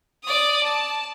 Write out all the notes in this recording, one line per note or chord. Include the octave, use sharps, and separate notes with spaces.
D5 D#6
A5